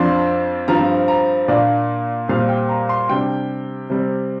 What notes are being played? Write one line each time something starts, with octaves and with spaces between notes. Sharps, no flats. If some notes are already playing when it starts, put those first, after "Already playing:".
Already playing: F2 F3 D4 C6
G2 F3 C4 A#5
A#5
A#2 A#3 D4 D5
A#2 G3 C4 F5
G5
A#5
C6
C3 G3 D4 G5
C3 G3 C4